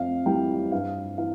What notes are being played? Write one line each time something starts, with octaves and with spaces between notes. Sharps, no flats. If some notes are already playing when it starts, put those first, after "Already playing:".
Already playing: F2 F5
E3 G3 G5
G2 F5
E3 F5